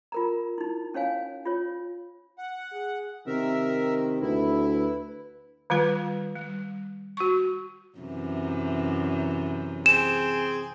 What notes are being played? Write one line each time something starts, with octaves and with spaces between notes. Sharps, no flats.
F4 A#4 A#5
D#4 E4
C#4 C#5 F5 G#5
F4 C#5
F#5
G#4
C3 D#3 A#4 E5
D2 E4 B4
B4
D#3 G3 F4 B4
G3
F#4 C#6
F#2 C3 E3
C4 G#4 E7